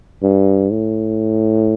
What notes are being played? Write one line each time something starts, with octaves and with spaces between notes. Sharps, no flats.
G2
A2